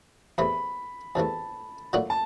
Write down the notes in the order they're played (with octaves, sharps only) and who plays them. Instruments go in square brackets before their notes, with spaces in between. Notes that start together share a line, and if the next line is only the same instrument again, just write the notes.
[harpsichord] E2 C3 E3 A3 [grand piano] B5
[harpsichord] E2 C3 E3 A3 [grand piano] A5
[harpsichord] A#2 F#3 A3 D4 F#4
[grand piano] A5